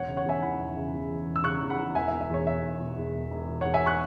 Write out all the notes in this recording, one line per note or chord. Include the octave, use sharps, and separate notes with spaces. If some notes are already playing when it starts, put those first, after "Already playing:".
Already playing: E1 C#5 F#5
C#3
C#5 F#5
E2 E5 G#5
E3 F#5 B5
E1
C#3
E2
E3
E1
E6
C#3 C#6 F#6
E2
F#5 B5
E3
E1 E5 G#5
E5
B2
E5
E2 C#5
E1 E5
E1
B2
E2
E1
E1
B2
E2 C#5 F#5
E5 G#5
C#6 F#6